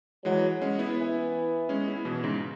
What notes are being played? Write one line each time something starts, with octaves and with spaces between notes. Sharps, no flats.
E3 F#3 G#3
G#3 C#4
B3 E4
E3
G#3 C#4
B3 E4
B2 E3
G#2 C#3